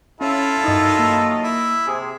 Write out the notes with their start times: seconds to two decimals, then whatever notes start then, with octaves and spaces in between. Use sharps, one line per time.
0.21 C#4 E4 F4 A4 C#5 F5
0.64 G2 D#3 F#3 D#4 D#5
0.99 A#3
1.43 E4
1.86 C3 G#4